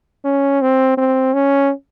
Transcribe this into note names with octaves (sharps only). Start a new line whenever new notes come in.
C#4
C4
C4
C#4